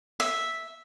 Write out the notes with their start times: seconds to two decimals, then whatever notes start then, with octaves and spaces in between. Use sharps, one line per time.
0.20 E5